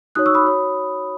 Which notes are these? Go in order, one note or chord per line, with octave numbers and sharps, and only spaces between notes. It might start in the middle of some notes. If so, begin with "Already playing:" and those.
D#4 F#4 C#5 D#6 F#6
C#6 E6
B5 D#6
F#4 C#5